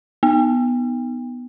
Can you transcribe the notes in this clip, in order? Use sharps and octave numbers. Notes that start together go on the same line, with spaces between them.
B3